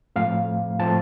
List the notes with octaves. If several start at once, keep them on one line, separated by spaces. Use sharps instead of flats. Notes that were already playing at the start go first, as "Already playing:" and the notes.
A2 F3 A3 C4 F5
A2 F3 A3 C4 A5